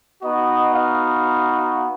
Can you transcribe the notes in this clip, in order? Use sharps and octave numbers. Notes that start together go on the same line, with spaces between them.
B3 D#4 F#4 D#5
F5